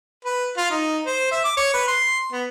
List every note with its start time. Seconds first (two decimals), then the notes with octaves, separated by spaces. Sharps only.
0.25 B4
0.57 F4
0.71 D#4
1.06 C5
1.31 E5
1.44 D6
1.57 C#5
1.74 B4
1.88 C6
2.32 B3